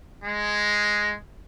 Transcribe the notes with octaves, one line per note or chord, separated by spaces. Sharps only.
G#3